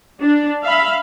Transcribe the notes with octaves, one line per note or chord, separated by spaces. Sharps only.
D4
E5 F5 B5